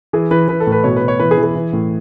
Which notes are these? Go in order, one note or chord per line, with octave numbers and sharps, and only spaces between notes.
E3 G#4
E3 B4
E3 B4
A4
A2
B4
B2 C#5
B4
B2
C#5
E3 B4
G#4
E3
G#4
E3
A2